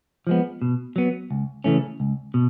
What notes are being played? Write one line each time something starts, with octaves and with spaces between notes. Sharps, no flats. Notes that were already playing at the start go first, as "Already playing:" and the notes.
F3 G#3 B3
B2
F#3 B3
C#2
C#3 E3 A3 C#4
C#2
B2